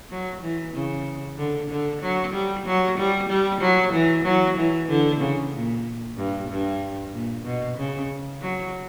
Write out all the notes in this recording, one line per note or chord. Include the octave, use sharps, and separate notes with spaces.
F#3
E3
C#3
D3
D3
F#3
G3
F#3
G3
G3
F#3
E3
F#3
E3
D3
C#3
A#2
G2
G2
A#2
B2
C#3
F#3